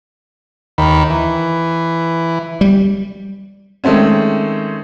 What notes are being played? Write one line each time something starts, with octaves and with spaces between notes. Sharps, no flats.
D#2 D#3 B5
E3
G3
D#3 G#3 A3 C4 C#4